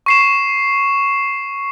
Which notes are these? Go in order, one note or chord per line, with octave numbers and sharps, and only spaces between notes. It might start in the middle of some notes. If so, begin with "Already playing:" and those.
C#6 C7 E7